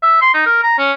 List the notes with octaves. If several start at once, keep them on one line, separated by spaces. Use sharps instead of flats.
E5
C6
D#4
A#4
A#5
C#4